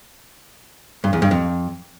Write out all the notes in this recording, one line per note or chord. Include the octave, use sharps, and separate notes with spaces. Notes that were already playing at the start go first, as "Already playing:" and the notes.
G2
E2
G2
F2